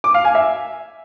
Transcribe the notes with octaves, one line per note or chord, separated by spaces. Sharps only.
D6
F5
G#5
E5